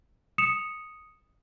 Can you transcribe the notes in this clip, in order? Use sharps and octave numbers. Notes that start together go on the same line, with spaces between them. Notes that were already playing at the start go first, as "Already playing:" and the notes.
D#6 C#7 E7 F7